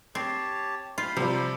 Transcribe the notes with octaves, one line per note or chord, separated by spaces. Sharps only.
C4 G4 C#5 A5
F4 C5 B5
C3 F3 G3